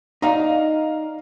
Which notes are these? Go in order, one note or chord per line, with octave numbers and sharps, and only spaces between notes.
D#4 D5 F5 A#5